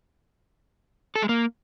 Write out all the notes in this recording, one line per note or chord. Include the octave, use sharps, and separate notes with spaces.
A4
G#3
A#3